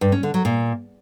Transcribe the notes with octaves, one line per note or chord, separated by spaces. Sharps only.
G2
C#4
D3
F#3
A#2